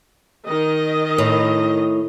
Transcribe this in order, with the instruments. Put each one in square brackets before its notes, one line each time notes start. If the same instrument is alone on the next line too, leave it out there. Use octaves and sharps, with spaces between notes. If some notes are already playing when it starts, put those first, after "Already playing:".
[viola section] D#3 D#5
[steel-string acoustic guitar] A2